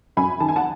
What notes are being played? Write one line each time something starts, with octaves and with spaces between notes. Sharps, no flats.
F#2 G#5 B5
D#3 A5
G#5
F#5 A5